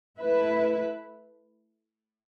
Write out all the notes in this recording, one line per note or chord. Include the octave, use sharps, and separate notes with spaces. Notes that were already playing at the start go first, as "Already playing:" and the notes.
A3 E4 B4 E5